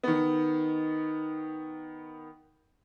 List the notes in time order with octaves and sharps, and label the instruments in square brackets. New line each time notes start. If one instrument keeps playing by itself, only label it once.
[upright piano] D#3 B3